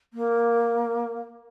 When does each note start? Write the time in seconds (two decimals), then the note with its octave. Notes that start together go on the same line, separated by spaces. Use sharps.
0.13 A#3